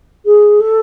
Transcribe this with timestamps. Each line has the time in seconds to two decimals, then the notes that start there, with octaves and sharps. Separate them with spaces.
0.25 G#4
0.59 A4